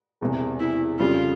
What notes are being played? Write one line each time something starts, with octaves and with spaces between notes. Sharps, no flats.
E1 E2 C3
E4
F2 C#3 G3 F4